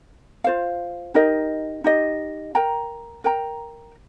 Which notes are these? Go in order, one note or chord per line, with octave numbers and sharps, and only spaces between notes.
F4 C5 F5
D#4 G4 A#4 D#5
D#4 G4 D#5
A#4 G5 A#5
A#4 G5 A#5